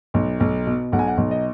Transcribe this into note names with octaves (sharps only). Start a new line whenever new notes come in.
B1
B1
B2
B1 F#5
G#5
F#5
B1
D#5